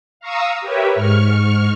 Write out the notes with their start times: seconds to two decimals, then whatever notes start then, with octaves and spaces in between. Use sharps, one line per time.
0.20 F5 A#5 C#6 D#6 E6
0.61 G4 A#4 B4 C#5 E5
0.95 G#2 C#6 F6